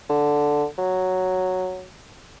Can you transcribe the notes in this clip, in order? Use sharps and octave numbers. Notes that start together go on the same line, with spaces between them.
D3
F#3